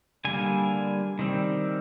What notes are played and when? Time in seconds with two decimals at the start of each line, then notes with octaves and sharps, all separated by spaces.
0.25 D3 G3 A#3 G#5
1.19 D#3 G3 C4